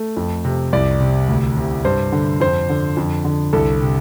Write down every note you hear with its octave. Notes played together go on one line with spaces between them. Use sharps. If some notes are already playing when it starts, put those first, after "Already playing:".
Already playing: A3
F2
C3
C2 D5
C3
D2
C3
G2 C5
D3
F2 C5
D3
F2
D3
C2 A4
C3